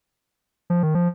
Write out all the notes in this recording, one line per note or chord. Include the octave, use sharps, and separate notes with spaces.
F3
D#3
F3